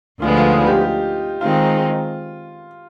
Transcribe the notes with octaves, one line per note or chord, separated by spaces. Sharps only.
D2 D3 F3 G#3 B3 F4
F4
D#4
G4
G4
D#3 G#3 C4 D#4 F4